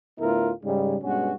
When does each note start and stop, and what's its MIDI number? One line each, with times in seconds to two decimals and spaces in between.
0.19 0.51 38
0.19 0.51 45
0.19 0.51 59
0.19 0.51 64
0.19 0.51 65
0.19 0.51 70
0.64 0.96 44
0.64 0.96 49
0.64 0.96 55
1.03 1.33 43
1.03 1.33 47
1.03 1.33 56
1.03 1.33 61
1.03 1.33 66